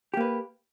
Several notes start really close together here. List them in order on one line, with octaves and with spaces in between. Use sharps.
G4 A#3 B4